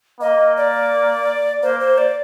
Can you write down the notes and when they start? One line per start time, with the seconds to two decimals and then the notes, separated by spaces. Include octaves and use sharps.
0.20 A#3 D#5
0.57 D5
1.63 A#3 C5
1.80 C5
1.98 D5